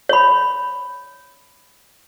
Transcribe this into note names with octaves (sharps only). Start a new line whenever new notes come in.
C#5 B5